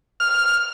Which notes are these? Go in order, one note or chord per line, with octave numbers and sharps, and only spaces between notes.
F6